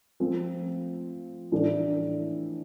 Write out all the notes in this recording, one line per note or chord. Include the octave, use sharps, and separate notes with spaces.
F3 A3 C4
A2 E3 A3 D4